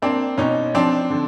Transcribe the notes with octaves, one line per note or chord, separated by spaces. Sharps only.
A#3 C4 D4
B2 C#4 D#4
F3 C4 D4
D3